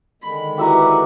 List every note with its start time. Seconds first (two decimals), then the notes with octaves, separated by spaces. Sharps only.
0.22 D3 D#3 G#3 B5
0.58 E4 F#4 G4 B4 E5 A#5